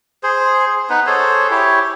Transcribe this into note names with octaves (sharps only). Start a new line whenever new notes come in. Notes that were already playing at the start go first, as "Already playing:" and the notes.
G#4 C5
B3 D#4 B4
G#4 A4 C5 C#5
E4 G4 C#5